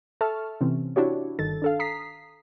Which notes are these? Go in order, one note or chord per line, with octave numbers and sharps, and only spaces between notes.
A4 E5 A5 C#6 F6
C3 E3 C4 C#4
D4 E4 F#4 G4 C#5
G1 D#3 A4 A6
D4 A4 F5
A#5 D#6 B6 C7